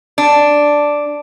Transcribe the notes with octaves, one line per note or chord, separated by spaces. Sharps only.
D4